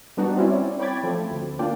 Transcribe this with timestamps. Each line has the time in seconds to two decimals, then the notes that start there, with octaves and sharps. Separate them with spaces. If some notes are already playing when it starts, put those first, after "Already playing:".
0.17 G3 B3 D4 D#4 F#4
0.37 C4 C#4 E4 D5
0.79 C#5 G5 B5 D6 G#6 A6
1.03 F3 A3 C4
1.31 D2
1.59 A#3 D4 F4 D5 G5